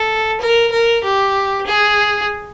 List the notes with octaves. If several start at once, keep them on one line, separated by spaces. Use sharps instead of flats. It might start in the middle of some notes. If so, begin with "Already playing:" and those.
Already playing: A4
A#4
A#4
G4
G#4